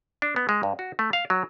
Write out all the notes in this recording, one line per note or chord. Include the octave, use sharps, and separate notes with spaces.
D4
B3
G#3
G2
F#4
A3
F5
F#3